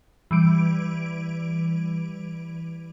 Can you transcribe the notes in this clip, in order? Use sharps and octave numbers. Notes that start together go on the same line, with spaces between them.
E3 G3 D7